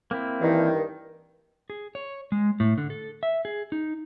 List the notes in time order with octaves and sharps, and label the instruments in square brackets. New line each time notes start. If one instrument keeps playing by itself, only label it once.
[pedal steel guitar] A#3 C4 E4
[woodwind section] G2 D#3 [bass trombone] E3
[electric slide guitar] G#4
C#5
G#3
A2
D3
A4
E5
G#4
D#4